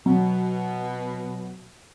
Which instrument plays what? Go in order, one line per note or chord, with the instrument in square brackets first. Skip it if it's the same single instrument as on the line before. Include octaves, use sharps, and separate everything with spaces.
[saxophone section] B2 [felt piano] F#3